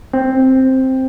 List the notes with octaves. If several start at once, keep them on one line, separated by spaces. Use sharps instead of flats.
C4